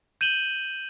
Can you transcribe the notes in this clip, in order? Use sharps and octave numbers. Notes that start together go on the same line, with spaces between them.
G6 D#7 E7 F#7 G7